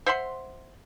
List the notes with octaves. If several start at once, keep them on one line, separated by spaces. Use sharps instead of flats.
C5 E5 F#5 C6